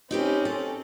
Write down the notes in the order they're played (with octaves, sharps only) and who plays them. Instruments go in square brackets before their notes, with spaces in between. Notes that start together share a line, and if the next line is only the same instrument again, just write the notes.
[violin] C4 C#4 [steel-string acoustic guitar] D#4 G4 B4
[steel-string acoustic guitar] A4